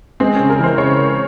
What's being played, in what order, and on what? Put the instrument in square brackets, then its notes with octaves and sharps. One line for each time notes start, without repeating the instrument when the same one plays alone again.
[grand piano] G#3 [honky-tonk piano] C4
[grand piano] C#3 [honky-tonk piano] C#4
[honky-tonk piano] A#4
[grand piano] E3 [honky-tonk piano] C5
[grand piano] C#3 [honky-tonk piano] C#5
[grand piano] G#3